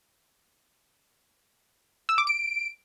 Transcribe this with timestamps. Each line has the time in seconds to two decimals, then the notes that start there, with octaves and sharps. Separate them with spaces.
2.09 E6
2.18 D6
2.27 D7